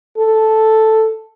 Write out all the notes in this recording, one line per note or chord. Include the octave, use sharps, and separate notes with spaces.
A4